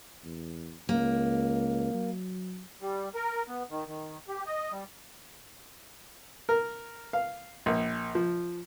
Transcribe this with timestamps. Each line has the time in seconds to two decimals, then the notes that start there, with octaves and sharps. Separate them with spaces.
0.24 E2
0.89 C#2 A#3
1.94 F#3
2.82 G3
3.15 A#4
3.48 B3
3.70 D#3
3.87 D#3
4.28 G4
4.46 D#5
4.72 G3
6.49 A#4
7.13 F5
7.66 A#1
8.15 F3